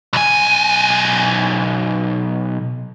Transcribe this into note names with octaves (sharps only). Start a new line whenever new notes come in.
B1 G#5